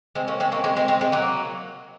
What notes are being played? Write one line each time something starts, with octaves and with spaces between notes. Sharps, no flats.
G#3 C4
A#3 C#4
G#3 C4
A#3 C#4
G#3 C4
G#3 C4
G#3 C4
G#3 C4
F#3 A#3